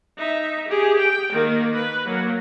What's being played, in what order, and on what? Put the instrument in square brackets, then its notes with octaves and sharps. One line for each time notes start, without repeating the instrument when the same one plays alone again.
[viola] D#4 E5
G4 G#4
G5
D#3 A#3
B4
F#3 A#3